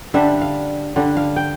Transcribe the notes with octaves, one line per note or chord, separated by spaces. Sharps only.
D3 G3 D4 E5
F5
D3 G3 D4
F5
G5